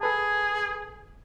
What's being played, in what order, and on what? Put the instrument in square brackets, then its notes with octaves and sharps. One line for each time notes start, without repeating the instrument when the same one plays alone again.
[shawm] G#4 [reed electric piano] A4 B4 A5